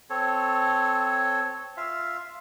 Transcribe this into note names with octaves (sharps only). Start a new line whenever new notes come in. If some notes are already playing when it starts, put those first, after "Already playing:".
C4 A4 C#5
F4 E5 F5